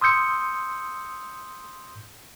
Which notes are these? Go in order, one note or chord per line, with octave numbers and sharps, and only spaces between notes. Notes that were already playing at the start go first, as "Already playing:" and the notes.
C6 D#6 E6 G6 C#7